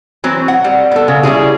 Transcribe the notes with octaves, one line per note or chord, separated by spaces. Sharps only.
E3 F#3 C4
F#5
G3
B3 A4
C#3
G3 C#4 E4 G#4